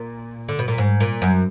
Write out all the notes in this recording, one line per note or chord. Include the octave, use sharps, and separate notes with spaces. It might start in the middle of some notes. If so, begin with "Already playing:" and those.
Already playing: A#2
D3
B2
A#2
G#2
A#2
F#2